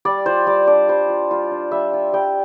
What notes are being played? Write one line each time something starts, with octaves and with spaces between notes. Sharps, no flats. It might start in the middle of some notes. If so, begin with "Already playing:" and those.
G3 D5
F4 C5
G3 D5
D4 D5
G3 C5
F4
G3 F4
D4
G3 E5
F4
G3 G5